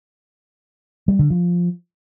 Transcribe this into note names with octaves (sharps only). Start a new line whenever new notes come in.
G3
D3
F3